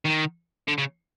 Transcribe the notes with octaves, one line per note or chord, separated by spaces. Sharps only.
D#3
D3
C#3